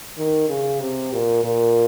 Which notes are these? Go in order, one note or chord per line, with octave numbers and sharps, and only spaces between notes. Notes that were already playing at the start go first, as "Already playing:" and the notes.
D#3
C#3
C3
A#2
A#2